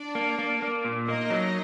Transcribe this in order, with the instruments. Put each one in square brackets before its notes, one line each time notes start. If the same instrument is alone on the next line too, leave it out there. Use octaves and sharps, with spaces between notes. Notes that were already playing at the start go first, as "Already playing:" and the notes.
Already playing: [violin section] D4 D5
[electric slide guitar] A#3
A#3
A#3
A#2
[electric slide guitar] A#3 [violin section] D#4 D#5
[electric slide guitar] F#3